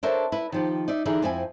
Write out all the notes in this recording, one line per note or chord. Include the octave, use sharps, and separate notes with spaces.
D4 A4 A#4 C5 C#5 E5
E4 B4
D#3 F3 G4
D#4 D5 E5
D3 E3 D#4 E4 G#4
F2 C4 E4 G#5